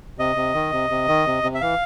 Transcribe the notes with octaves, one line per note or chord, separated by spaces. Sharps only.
C3 D#5
C3
D#3
C3
C3
D#3
C3
C3
E5
E3 F5